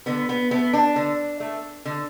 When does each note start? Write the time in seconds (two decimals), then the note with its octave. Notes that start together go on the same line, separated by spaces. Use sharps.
0.06 D3 B3
0.29 B3
0.51 A3 B3
0.73 D4
0.96 D3
1.40 A3
1.85 D3